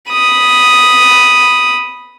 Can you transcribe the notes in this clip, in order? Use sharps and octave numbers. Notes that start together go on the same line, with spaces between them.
B5 D#6